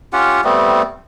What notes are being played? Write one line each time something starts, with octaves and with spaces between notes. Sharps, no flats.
C#4 F4 G4 F#5
G3 A3 B3 C4